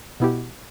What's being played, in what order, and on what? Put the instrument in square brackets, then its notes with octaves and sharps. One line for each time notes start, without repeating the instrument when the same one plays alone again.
[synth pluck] B2 B3 E4 G4